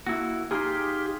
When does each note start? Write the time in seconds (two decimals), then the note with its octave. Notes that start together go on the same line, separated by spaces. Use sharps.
0.06 A#3 E4 F#4
0.51 D#4 F4 G4 G#4 F6